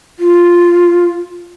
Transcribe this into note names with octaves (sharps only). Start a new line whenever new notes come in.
F4